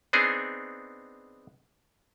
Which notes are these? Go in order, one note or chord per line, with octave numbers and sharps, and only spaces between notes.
B3 C4 D4 D#4 G#4